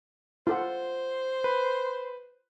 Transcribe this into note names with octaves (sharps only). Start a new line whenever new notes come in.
F4 A4 C5 F#5
B4